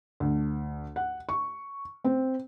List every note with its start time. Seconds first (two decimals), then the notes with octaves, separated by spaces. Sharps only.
0.20 D2
0.96 F#5
1.29 C#6
2.04 C4